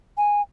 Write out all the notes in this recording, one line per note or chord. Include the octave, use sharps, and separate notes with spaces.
G#5